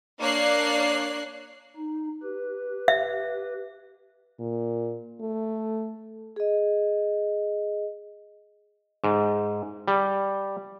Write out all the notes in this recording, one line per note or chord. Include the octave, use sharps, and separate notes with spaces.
A#3 D4 C#5 D5 F#6 C7
D#4
G4 B4
E5
A#2
A3
G#4 D#5
G#2
G3